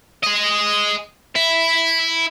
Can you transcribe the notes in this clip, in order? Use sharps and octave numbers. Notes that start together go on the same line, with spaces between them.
G#4 D#5
E4 E5